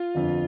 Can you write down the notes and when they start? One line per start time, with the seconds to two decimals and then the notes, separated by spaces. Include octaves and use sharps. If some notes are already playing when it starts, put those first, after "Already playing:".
Already playing: F4
0.15 G1 F2 D3